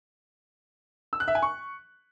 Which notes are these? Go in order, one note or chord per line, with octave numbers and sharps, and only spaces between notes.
E6
F#6
E5
G#5
C#6